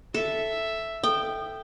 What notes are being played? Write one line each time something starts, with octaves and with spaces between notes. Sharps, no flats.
A4 E5
A4 G5